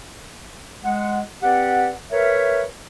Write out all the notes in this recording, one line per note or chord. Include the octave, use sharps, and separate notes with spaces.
G#3 F#5
C4 G4 B4 D5 F#5
A#4 B4 C#5 E5